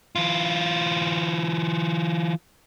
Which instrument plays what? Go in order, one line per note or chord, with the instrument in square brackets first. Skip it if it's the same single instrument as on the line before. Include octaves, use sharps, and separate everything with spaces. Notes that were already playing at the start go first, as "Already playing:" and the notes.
[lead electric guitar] E3 F4